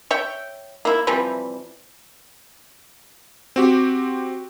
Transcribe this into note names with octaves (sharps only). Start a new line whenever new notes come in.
C#5 E5 G5
A#3 E4
C3 E3 F3 G3
C4 F#4 G4